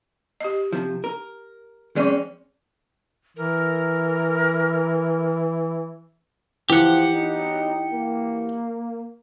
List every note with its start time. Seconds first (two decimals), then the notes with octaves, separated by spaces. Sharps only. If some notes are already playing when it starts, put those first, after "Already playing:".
0.40 G4 D#5
0.73 C3 F3
1.04 A#4
1.96 F3 G#3 C4 C#4 D5
3.37 E3 A#4
6.70 E3 F3 G4 F#5
7.14 D#4
7.93 A#3